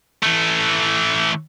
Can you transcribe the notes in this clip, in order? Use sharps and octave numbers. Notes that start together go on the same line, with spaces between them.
E3 A3